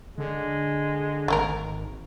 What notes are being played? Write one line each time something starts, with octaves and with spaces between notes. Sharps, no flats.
D3 G#3
G#1 A3 A#3 A#4